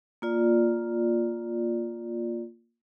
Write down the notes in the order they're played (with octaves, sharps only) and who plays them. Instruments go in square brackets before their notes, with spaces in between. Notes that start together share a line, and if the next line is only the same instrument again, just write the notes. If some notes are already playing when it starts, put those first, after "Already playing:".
[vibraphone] A#3 F4 D5